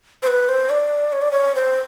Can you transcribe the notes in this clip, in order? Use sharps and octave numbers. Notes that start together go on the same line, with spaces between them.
C5
B4
C5
D5
C#5
D5
C#5
C5